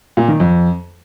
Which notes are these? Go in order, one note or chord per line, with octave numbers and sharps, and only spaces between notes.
A#2
D#3
F2